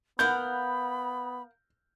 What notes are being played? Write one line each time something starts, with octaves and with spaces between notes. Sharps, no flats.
B3 A#4 F5 F#5 B5 G6